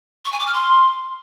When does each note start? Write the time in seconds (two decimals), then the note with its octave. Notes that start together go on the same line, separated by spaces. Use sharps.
0.25 C#6
0.32 G#5
0.39 D6
0.47 F6
0.54 C6